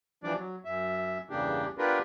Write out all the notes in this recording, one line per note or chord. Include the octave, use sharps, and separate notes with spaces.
E3 F3 G3 D4 D5
F#3
F#2 E5
E2 G2 C#3 A#3 D4 G4
B3 D4 F4 G4 A#4 B4